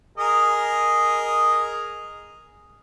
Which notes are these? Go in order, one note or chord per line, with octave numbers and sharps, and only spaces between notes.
G#4 A#4 D#5